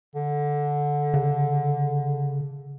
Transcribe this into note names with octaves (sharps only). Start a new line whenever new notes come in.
D3
C#3